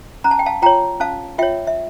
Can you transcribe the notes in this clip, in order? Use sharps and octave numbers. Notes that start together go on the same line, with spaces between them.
C#4 A#5
A5
G5
F5 A5
F4 C#5 G5 A#5
C#4 F5 A5
F4 C#5 E5 G5
E5